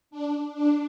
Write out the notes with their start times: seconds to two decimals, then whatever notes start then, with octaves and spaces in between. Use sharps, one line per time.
0.11 D4
0.54 D4